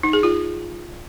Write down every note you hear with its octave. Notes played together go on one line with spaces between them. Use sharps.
D#4
G#4
F4